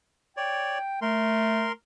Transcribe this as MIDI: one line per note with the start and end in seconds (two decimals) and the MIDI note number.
0.37 0.78 73
0.37 0.78 74
0.37 0.99 79
1.02 1.70 57
1.02 1.72 70
1.02 1.72 84